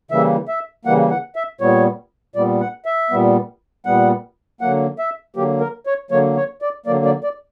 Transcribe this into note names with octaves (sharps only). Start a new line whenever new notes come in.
C#3 E3 G3 A#3 E5
E5
C#3 E3 G3 A#3 F#5
F#5
E5
A#2 G3 B3 C#5
A#2 G3 B3 D5
F#5
E5
A#2 G3 B3
A#2 G3 B3 F#5
D3 F#3 A#3 F#5
E5
D3 F#3 A#3 G4
A#4
C#5
D3 F#3 A#3 C#5
C#5
D5
D3 F#3 A#3 D5
D5
D5